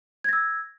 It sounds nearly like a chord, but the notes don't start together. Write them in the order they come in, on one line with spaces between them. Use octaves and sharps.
G#6 A#6 E6